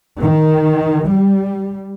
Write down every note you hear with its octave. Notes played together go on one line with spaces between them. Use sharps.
D#3
G3